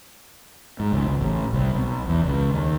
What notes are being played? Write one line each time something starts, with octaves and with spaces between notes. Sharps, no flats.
G#2
C#2
C#2
A1
C2
B1
E2
C#2
D#2